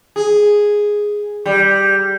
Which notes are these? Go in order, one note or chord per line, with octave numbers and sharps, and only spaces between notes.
G#4
G3